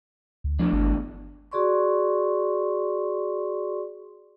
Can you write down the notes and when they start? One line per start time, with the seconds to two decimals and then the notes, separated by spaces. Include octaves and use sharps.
0.44 D2
0.59 E2 F3 A3 D4
0.72 G1
1.52 F#4 G#4 D5 C6 C#6